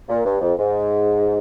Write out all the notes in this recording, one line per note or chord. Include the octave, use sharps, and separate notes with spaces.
A#2
G2
F2
G#2